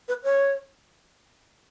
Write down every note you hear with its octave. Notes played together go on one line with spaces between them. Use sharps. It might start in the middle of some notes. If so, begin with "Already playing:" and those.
B4
C#5